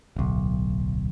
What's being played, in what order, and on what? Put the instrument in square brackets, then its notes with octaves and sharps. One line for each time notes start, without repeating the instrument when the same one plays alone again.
[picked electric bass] D1 B1